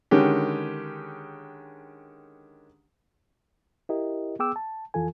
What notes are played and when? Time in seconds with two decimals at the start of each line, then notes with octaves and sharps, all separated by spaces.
0.11 D3 D#3 G#3 C#4 G4
3.89 E4 G4 A#4 D#5
4.39 B3 G#4 G5 D6 E6
4.56 A5
4.94 F2 E3 F4 A4 G#5